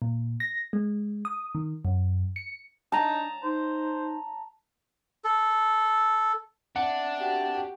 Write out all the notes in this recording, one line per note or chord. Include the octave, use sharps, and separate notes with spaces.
A#2
A#6
G#3
D#6
D#3
F#2
C#7
D4 D#4 A5 A#5
D#4 C5
A4
C4 D4 E5 F#5
F#4 G4